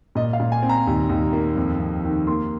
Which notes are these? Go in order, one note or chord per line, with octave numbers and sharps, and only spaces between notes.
A#2 D#5
F5
A#2
G#5
C4
A#5
D#2
D#2
A#3
F2
F2
D#3
A#3 C6